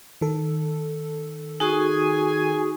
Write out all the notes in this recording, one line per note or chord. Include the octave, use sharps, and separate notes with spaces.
D#3 A4
D#4 F#4 G#4 G#5 C#6